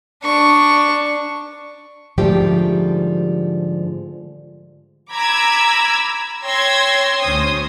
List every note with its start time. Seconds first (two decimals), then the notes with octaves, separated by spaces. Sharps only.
0.24 D4 C#6
2.18 G#2 D3 F3 G3 A3 G4
5.13 A#5 B5 D6 E6 G#6
6.44 C#5 G5 C6 E6 G#6 A#6
7.21 D2 C#4 C5 D#6